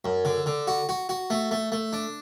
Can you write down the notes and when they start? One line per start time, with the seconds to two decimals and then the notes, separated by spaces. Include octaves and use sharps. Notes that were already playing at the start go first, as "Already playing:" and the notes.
0.05 F#2
0.25 D3
0.46 D3
0.67 F#4
0.89 F#4
1.09 F#4
1.30 A3
1.51 A3
1.72 A3
1.93 D4